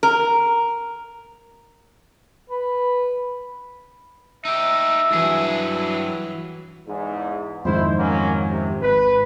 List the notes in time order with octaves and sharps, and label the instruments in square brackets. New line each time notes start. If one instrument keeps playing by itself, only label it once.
[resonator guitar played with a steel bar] A#4
[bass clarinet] B4
[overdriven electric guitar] D#4 G4 [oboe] E5
[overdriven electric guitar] G2 G#4 [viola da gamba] E3 F#3
[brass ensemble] E2 G#2
[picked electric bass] F2 G#2 D#3 [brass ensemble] E4 C5
[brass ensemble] F#3 A#3 C#4
C3
[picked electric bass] G#1 [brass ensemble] B4